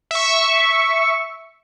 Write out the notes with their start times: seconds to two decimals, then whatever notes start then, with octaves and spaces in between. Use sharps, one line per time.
0.11 E5 C#6